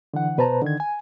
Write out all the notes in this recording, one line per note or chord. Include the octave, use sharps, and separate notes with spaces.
D3 E3 F#5
B2 B4 C5 A5 A#5
D3 D#3 G#6
G#5